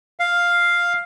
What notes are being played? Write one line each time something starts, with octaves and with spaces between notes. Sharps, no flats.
F5